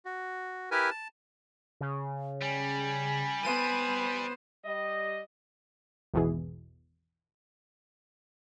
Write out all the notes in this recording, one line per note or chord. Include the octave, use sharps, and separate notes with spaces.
F#4
E4 G4 A#4 B4 G#5
A5
C#3
G3 G#5
B3 C5 D#7
G3 D#5
G#1 E2 B2 E3 G#4